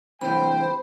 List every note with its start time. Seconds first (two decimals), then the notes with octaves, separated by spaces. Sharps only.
0.21 G#2 C3 E3 C5 G5 B5